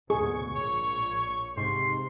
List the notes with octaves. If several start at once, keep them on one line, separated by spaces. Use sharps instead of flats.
D2 G#2 B2 G#4 C#6
A#1 A#2 C#5
G#2 C3 C6